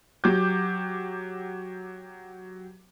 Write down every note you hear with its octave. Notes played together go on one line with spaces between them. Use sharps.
F#3 G4 D6 G6